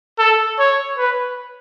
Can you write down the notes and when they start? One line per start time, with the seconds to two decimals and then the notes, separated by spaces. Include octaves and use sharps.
0.19 A4
0.59 C#5
0.98 B4